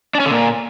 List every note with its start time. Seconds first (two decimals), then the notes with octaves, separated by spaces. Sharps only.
0.15 D4
0.20 C#4
0.25 D3
0.31 A#2